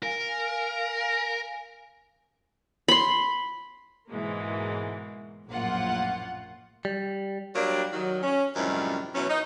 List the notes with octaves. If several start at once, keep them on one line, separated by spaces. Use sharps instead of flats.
A#4 F5 G#5
B5 C6
G#2 B2 E3 G#3 A#3
A#1 F#2 A2 A#3 F4 F#5
G3
F#3 G3 A#3 D4 G4
D#3 F#3
C#4
F#2 A2 C3 D#3 F3 G3
F#2 B2 E3 C#4
D#4